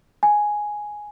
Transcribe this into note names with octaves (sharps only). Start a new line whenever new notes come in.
G#5